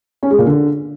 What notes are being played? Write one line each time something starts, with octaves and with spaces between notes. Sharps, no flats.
C#4
G#3
A#2
D3